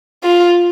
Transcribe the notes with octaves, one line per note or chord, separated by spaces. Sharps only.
F4